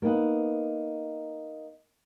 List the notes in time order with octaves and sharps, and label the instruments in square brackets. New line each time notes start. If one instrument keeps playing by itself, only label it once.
[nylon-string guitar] A#3 B3 D#4 F#5